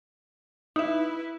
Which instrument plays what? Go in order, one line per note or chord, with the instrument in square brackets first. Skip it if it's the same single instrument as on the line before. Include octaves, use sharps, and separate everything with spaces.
[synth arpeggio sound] D#4 E5 [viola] E4 B4